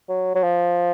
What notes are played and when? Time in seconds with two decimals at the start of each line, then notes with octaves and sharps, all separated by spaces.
0.09 F#3
0.35 F#3
0.43 F3